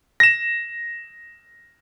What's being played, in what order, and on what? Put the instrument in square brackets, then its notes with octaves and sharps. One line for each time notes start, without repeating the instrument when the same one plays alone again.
[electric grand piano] A#6 E7